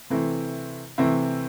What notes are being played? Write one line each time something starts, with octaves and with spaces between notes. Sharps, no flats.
C3 E3 A3 C4 E4
C3 E3 A3 C4 E4